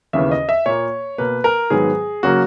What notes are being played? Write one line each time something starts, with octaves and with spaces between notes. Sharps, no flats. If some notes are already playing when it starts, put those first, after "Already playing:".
D#2 C#3 E3 B3 E5
D#5
E5
A#2 A#3 C#5
B2 A#3 B4
A#4
G#2 D#3 F#3 B3 G#4
C#3 F#3 A#3 F#4